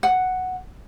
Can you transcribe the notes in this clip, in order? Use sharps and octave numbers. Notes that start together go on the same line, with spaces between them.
F#5